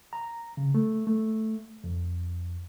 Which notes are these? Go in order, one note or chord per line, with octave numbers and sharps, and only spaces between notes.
A#5
C#3
A3
A3
F2